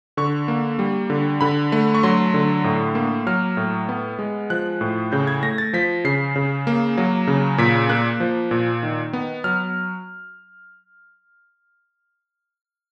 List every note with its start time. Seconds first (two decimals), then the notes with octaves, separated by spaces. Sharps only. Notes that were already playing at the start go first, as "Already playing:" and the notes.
0.17 D3 C#6
0.48 A#3
0.79 G3
1.10 D3
1.41 D3 B5
1.72 A3
1.94 C#6
2.03 F#3 C6
2.34 D3
2.64 A2
2.95 A#3
3.27 F#3 F6
3.57 A2
3.89 B3
4.19 G#3
4.50 F3 F#6
4.81 A2
5.12 C#3 G6
5.27 G#6
5.43 A3 A#6
5.58 A6
5.73 F3 B6
6.05 C#3 C7
6.36 C#3
6.67 A#3
6.97 F#3
7.27 C#3
7.58 A#2 B6
7.89 A#3 F#6
8.20 F3
8.51 A#2
8.83 D#3
9.13 B3
9.44 F#3 F6